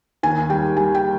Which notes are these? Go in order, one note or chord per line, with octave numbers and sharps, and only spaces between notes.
D#2 G#5
G3 G5
G3 G#5
G5